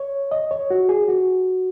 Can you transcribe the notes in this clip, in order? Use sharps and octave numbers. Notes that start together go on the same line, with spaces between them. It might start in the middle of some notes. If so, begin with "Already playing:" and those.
Already playing: C#5
D#5
C#5
F#4
G#4
F#4